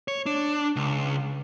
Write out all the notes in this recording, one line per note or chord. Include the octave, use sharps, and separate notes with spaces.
C#5
D4
C#2